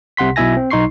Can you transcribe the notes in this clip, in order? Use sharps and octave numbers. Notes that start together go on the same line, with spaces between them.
C2 C3 F#5 C6 B6
B1 B2 E4 E5 G#5 A#6
C4
B1 D#4 C6 C#6 C7